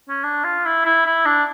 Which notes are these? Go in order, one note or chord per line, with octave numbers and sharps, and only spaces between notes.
C#4
D4
F4
E4
E4
E4
D4